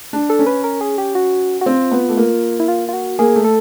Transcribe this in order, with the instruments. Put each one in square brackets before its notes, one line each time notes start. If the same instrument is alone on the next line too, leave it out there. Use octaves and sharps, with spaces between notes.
[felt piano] D4
[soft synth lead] A4
[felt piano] C#4
[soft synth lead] B4
A#4
G#4
G4
F#4
F#4
[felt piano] C4 [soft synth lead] F4
[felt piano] B3
A3
A#3
[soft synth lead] E4
F4
F4
F#4
[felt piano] A#3 [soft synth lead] G#4
[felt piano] A3
[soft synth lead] A4